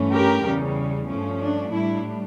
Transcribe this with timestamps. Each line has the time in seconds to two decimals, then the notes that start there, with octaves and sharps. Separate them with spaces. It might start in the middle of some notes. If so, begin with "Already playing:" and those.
Already playing: G2 E3 A3 C#4
0.13 G4 A#4
0.44 E2 C#3 G3 C#4
1.08 G2 F3 A3 C#4
1.40 D4
1.72 A2 G3 D4 E4